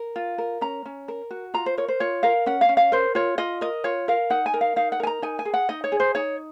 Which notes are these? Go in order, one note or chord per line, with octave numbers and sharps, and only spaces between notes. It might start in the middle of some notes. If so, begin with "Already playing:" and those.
Already playing: A#4
F4
A#4
C#4 A#5
C#4
A#4
F#4
F4 A#5
C5
A#4 C#5
C5
F4 C#5
A#4 F5
C#4 F#5
F5
C#4
F5
A#4 C5
F4 C#5
F4 D#5
A#4 D#5
F4 C#5
A#4 F5
D#4 F#5
G#5
A#4
F5
D#4 F5
F#5
A#4 G#5
A#5
D#4 G#5
G#5
G#4
F#5
D#4 D#5
C#5
G#4
C5
D#4 C#5